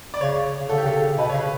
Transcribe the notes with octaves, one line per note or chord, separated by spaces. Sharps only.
D5
C#3 C#5
C#3
D3 A4
G4
C#3 A4
C#3
B2 B4
C#3 C#5
B4